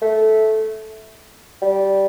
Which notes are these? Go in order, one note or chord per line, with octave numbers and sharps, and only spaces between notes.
A3
G3